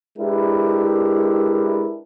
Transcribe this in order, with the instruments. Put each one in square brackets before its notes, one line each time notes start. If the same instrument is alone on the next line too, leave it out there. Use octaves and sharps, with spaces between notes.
[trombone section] G#3 D4 E4 G4 A#4 B4